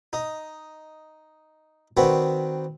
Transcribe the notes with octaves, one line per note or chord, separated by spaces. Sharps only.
D#4 D#5
D#3 C4 D4 F#4 B4 C#6